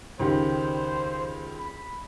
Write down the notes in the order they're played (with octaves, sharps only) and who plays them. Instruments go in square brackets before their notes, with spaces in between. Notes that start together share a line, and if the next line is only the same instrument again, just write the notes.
[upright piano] C#2 D#3 G4 [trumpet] C5
[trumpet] B5